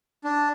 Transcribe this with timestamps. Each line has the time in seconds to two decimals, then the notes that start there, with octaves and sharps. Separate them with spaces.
0.24 D4